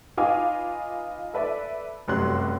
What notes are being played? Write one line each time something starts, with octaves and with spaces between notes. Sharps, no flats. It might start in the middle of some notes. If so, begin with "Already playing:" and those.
D#4 F4 B4 F5 G#5 D6
A4 B4 D5 E5
F1 F#2 G3 F#4 C6 F#6